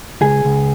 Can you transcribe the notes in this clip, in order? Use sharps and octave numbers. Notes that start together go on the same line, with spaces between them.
C#2 G#4
C#2